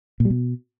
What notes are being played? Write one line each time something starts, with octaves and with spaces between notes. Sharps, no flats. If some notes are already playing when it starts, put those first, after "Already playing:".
A#2
G3
B2